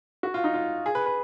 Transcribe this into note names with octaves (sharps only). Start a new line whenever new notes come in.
F#4
F4
D#4
F4
G#4
B4
B4